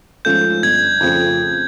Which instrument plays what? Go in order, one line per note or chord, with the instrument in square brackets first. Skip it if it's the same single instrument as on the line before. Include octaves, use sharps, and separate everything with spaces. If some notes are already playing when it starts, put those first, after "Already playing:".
[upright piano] G#2 F3 A3 C#4 [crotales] G6
[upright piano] G1 [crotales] G#6
[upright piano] F2 C#3 F3 A3